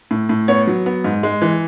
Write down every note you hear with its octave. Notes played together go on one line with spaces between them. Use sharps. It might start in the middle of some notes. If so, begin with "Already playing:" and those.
A2
A2
B3 C#5
F#3
B3
G#2
G#3
E3